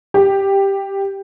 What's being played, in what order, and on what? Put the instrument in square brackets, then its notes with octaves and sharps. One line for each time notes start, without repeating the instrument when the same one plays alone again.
[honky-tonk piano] G4